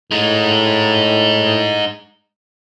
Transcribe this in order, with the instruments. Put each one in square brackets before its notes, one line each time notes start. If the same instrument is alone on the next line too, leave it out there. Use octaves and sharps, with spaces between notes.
[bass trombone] A2 [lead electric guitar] G#3 D#4